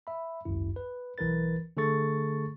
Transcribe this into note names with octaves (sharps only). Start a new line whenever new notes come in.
E5 B5
G#1 C#2 F#2 E4
B4
B1 E3 A#4 B4 A6
D3 A3 G#4 A4 C#6 A6